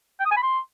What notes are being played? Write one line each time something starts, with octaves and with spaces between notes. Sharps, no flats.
G5
D#6
G#5
B5
C6